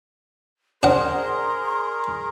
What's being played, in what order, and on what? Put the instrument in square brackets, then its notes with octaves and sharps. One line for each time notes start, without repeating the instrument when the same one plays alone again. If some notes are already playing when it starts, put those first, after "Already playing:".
[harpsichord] D4 F#5 [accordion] G#4 A#4 A#5 [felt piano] C5 D5 [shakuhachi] C6